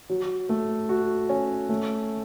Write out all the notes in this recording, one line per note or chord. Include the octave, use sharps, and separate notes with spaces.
F#3
A3
F#4
C#4
A3